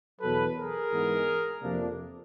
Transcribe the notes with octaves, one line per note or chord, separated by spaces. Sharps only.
E2 B2 F#3 A4 B4
G#4 A#4
G#2 E3 G#3 B3
F2 C3 F3 A#3 D4